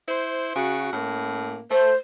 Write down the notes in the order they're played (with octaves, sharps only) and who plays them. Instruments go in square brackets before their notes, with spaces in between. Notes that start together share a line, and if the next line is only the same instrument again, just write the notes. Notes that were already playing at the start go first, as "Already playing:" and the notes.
[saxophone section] E4 C5
C#3 F#4
A2 A#3 C#4
[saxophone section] A3 [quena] C5